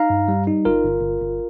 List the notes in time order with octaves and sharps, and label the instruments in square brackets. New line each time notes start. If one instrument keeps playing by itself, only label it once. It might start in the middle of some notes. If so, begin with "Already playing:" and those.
Already playing: [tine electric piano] D#4 F5 A#5
G2
G3
D#4
G1 F4 A#4
G1
G1
G1